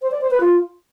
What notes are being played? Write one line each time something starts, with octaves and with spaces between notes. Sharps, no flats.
C5
D5
C5
B4
F4